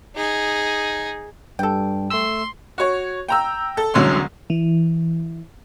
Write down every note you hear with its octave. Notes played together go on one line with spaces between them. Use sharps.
D#4 G#4
G2 G3 A4 G5
A3 C6 E6
F#4 C#5
G5 A#5 E6
A4
E1 C2 D3 F#3 C#4 C6
E3